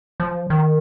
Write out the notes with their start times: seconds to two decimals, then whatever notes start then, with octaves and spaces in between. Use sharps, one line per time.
0.20 F3
0.50 D#3